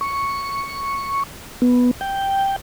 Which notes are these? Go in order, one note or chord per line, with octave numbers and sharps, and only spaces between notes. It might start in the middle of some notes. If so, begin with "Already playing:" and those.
C#6
B3
G5